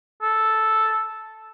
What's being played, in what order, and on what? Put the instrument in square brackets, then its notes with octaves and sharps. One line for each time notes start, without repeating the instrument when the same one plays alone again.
[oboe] A4